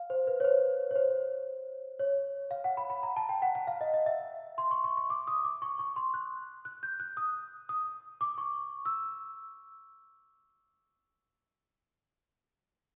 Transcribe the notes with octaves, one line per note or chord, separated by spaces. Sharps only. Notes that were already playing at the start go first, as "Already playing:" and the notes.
Already playing: F5
C5
B4
C#5
C5
C#5
C5
C#5
F5
F#5
B5
B5
A#5
A5
G5
F#5
F#5
F5
D#5
D#5
E5
C6
C#6
C#6
C#6
D6
D#6
D6
C#6
C#6
C6
F#6
F#6
G6
F#6
D#6
D#6
D6
C#6
E6